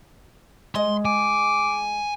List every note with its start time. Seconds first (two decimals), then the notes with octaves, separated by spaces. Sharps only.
0.75 G#3 D#5 C6
1.05 G#5 D6